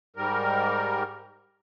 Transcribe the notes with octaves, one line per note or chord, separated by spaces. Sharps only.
G#2 G3 A#4